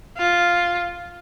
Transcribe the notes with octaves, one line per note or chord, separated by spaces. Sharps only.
F4